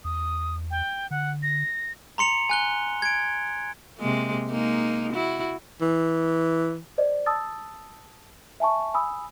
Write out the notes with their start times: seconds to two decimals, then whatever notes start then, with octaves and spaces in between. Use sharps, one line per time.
0.04 E2 D#6
0.71 G5
1.11 D3 F#5
1.43 A#6
2.18 A#5 C6 C#7 F7
2.50 G#5 F#6 G7
3.02 G#6 D7
3.99 C3 G#3 A#3
4.50 G#3 A#3 D#4
5.13 E4 F#4
5.81 E3
6.98 C5 D5 D#5
7.26 A5 D#6 E6 A6
8.60 E5 G#5 A5 C#6
8.94 G#5 B5 D#6 E6